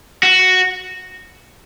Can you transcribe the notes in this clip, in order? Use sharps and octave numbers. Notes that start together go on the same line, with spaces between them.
F#4